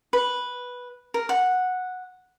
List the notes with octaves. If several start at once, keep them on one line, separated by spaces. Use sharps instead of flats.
B4
A#4
F#5